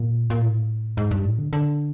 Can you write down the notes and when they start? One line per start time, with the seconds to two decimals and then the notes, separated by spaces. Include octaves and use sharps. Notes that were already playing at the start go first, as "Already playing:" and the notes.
Already playing: A#2
0.30 A#2
0.41 A2
0.97 G#2
1.11 G2
1.25 A2
1.38 D3
1.53 D3